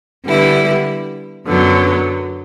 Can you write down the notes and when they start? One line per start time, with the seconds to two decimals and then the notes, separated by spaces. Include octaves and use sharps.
0.25 D3 G3 B3 E4
1.46 F#2 D3 F#3 B3